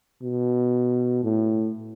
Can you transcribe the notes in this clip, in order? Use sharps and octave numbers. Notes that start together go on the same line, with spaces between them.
B2
A2